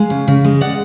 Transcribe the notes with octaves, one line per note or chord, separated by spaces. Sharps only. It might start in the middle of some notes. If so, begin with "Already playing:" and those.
Already playing: G#3 F5 G#5
C#3
C#3
G#3
D5 F#5